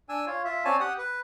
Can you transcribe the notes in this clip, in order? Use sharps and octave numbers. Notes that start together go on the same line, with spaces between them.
D4 G#5 E6
F4 C#5
F4 E5
C4 C#4 C#5 D5 G#5 A5
G4 F#5 D#6
B4